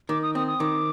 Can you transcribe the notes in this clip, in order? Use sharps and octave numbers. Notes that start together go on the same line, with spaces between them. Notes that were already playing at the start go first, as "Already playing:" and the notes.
D#3 D6
D#6
C4 D#6
D#6
D#3 D6